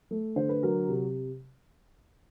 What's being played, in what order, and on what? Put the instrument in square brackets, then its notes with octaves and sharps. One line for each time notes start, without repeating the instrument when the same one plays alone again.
[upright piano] A3
D3 C5
B4
F#3 A#4
C3